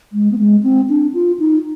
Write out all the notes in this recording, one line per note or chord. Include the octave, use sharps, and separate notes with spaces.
G#3
B3
G#3
C4
D4
F4
D#4